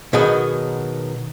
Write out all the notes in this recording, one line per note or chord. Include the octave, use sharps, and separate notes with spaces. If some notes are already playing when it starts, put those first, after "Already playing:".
B2 D#3 F#3 B3 G#4